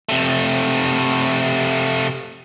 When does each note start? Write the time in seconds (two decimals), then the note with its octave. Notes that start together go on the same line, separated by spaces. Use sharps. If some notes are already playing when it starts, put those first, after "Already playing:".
0.09 C3 A3